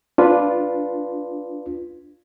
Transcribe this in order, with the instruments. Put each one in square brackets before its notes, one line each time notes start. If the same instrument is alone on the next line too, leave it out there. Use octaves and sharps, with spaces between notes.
[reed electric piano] D4 F4 B4